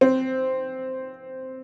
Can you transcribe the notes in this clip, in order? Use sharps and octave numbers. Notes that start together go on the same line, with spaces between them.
C4